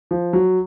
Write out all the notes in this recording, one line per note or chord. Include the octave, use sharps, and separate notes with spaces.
F3
F#3